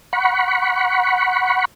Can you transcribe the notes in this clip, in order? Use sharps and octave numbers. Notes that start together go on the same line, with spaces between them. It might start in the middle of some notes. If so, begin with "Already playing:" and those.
F#5 B5 C#6